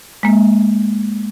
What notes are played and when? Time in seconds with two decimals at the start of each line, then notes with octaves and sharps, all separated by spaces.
0.23 G#3 A#3